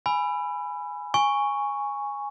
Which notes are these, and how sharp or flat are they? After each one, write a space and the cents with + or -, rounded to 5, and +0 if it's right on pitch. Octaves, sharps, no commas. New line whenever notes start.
G#5 +0 B5 +0 E6 +35
G#5 -10 C#6 +0